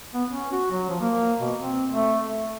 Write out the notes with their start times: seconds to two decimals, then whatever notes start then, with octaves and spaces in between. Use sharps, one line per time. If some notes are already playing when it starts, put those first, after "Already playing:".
0.13 B3
0.30 C#4
0.52 F#4
0.71 F#3
0.89 F3
1.01 A#3
1.40 B2
1.60 C4
1.92 A3
2.25 A3